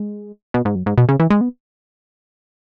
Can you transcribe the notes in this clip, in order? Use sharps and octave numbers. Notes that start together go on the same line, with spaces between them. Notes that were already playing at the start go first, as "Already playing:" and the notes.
Already playing: G#3
B2
G#2
F#2
G#2
B2
C#3
E3
G#3
B3